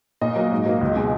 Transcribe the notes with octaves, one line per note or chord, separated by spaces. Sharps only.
A#2 D#5
F#3 A#3
G#2
F#3 A#3
C#2
B2 G#3